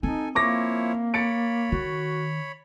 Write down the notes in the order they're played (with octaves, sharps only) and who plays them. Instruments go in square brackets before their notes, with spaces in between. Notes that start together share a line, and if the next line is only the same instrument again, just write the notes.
[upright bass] C4 [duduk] D#4 [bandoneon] A4 G#5
[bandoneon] F3 E4 C#5 [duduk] A#3 [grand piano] C#6 D6 A#6
[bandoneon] C#5 B5 [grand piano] A6 C#7 D7
[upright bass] D#3 [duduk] F#4